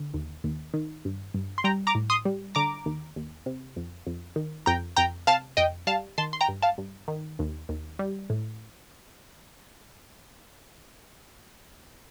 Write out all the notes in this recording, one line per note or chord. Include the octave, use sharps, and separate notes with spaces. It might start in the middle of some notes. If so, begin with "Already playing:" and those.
Already playing: D3
D#2
D#2
D#3
G2
G2
C6
G3 G5 A#5
A#5 D6
A2
C6 D#6
G3
D3 A#5 D6
D#2
D#2
C3
F2
F2
D#3
F2 G5 A#5
F2 G5 A#5
C3 F5 A5
F2 D#5 G5
G3 F5 A5
D#3 A5 C6
C6
G5 A#5
G2
F5 A5
G2
D#3
D#2
D#2
G3
A2